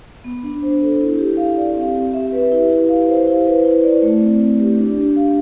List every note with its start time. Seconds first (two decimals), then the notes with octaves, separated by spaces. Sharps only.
0.24 B3
0.43 D4
0.62 C5
0.82 A4
1.00 E4
1.19 G4
1.37 F5
1.57 D5
1.76 C4
1.95 G4
2.14 E5
2.32 B4
2.52 E4
2.70 G4
2.89 F5
3.08 C5
3.27 E4
3.46 B4
3.65 E4
3.84 D5
4.02 A3
4.21 C4
4.40 A3
4.59 G4
4.78 D4
4.97 G4
5.16 F5